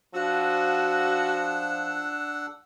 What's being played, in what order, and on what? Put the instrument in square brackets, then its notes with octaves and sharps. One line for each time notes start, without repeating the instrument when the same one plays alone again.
[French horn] F3 [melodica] D4 F#5 E6 [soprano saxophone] F#4